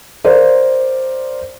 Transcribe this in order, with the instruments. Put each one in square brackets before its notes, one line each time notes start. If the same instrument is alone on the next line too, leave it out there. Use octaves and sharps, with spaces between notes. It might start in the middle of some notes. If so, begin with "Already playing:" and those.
[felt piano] A#4 C5 D5 F5